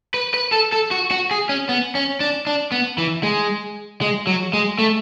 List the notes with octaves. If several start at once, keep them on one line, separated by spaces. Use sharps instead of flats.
B4
B4
A4
A4
F#4
F#4
G#4
C#4
B3
C#4
D4
D4
B3
E3
G#3
G#3
F#3
G#3
A3